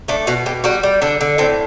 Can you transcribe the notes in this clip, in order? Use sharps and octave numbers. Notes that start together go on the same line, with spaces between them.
A3 D4
B2 F#4
B2 G4
G3 F#4
G3
D3 D4
D3
A2 C4